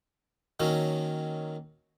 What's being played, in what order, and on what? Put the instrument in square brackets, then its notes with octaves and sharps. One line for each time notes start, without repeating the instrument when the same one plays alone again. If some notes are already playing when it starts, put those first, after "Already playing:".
[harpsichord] D#3 F#3 A#3 C#4